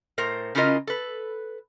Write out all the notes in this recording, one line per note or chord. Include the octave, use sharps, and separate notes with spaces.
A2 A#4 C5
C#3 C#4 E4 F4 A#4 D#5
A4 B4